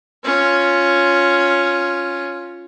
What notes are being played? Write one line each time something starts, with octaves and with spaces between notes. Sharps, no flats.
C#4 F4